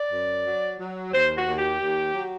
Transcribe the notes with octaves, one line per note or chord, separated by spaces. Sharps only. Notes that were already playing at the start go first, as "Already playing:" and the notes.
Already playing: D5
F#2
F#3
F#3
D#2 C5
F#4
D#2
G4
D#2
F#3